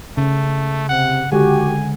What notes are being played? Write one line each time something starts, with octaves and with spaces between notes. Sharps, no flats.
C#3 A3
C3 F#5
D3 G#3 F#4 G4 F#5 G#5